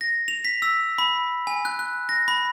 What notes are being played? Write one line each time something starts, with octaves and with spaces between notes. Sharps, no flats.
A#6
F7
B6
E6
B5
G#5
F#6
F#6
A#6
B5